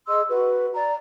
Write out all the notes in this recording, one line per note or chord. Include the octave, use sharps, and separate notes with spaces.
G#4 D#5 C6 E6
F#4 B4
D5 A#5